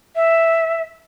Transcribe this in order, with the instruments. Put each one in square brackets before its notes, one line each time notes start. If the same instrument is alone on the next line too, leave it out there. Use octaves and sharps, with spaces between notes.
[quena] E5